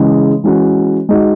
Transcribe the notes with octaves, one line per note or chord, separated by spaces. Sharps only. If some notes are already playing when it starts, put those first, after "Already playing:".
Already playing: C#3 E3 G#3
E3 G#3 C#4 F#4
G#3 D#4 F#4